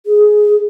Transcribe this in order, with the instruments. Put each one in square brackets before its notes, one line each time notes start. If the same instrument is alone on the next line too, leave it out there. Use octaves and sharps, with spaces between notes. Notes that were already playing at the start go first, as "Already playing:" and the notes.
[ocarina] G#4